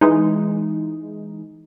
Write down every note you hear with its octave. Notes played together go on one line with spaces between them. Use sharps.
E3 G#3 D#4